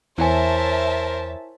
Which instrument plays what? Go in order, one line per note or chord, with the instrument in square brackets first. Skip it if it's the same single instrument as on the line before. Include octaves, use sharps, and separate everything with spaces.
[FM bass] E2 [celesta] E4 G#5 [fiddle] A#4 C5 [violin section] C#5 E5 A5